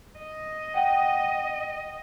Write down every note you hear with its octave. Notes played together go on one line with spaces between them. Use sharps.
D#5
F#5 G5 D#6